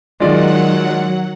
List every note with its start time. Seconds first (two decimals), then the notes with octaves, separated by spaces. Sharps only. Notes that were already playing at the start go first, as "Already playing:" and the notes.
0.20 D#3 F#3 G#3 F4 D5 F#5